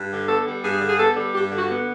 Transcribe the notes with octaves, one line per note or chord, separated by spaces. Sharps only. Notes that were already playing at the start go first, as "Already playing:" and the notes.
Already playing: G2
D3
B3 A4
G3
G2 G#4
D3
G#4
B3 A4
G3
G2 G4
D3
F#4
B3